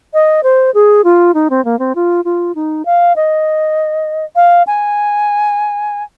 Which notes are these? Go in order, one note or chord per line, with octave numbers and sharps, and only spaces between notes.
D#5
C5
G#4
F4
D#4
C4
A#3
C4
F4
F4
D#4
F5
D#5
F5
G#5